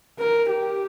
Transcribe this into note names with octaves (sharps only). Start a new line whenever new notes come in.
A#4
G4